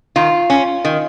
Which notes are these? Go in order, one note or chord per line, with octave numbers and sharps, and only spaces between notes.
D#3 F4
C#4
D#3